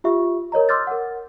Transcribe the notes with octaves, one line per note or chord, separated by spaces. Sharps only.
F4 G4 E5 C#6
A#4 C#5 D#5 A#5
C6 D6 E6 F6 G6 A6
A#4 F#5